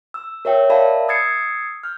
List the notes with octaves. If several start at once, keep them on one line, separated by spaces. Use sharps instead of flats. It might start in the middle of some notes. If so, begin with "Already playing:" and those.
E6
A#4 C#5 E5 G5
A#4 D5 E5 F5 A5 B5
D#6 E6 G#6 A6 C7 C#7
F6 G6